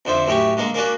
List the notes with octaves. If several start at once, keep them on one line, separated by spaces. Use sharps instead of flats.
F2 D3 C5 E5
F#2 A2 E4 G4 C#6
D3 G#3 A#3
A#3 C#4 D4 F#4